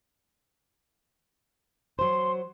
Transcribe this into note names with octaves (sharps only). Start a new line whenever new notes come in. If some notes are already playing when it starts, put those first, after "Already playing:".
F#3 C5 C6